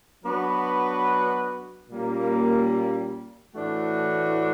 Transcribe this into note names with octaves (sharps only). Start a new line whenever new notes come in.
F#3 B3 D4 F#4 B4
A#2 G3 A#3 C#4
A2 E3 A3 D4 F#4